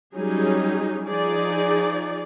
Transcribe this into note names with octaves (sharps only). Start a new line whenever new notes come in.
F#3 G3 C#4 D#4 G#4
F3 D#4 G#4 D5